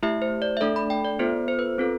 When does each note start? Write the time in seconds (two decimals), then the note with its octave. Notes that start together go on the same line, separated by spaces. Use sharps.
0.03 A3 E4 G4 E5
0.22 C5
0.42 D5
0.57 E5
0.61 A3 D4 A4 D5
0.76 B5
0.90 G5
1.05 D5
1.19 B3 F4 A4 C5
1.48 C5
1.59 B4
1.78 C4 F4 A4